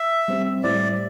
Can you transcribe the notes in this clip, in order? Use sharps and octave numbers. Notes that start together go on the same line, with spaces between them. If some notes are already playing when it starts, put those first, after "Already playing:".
Already playing: E5
G3 C4 G4
A2 G3 E4 C5 D5